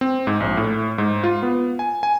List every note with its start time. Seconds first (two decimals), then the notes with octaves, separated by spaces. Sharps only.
0.01 C4
0.27 G#2
0.40 A#1
0.57 A2
0.98 G#2
1.24 F4
1.43 B3
1.79 G#5
2.03 G#5